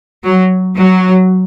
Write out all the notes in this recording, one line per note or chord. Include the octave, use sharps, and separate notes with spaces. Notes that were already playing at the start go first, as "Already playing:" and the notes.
F#3
F#3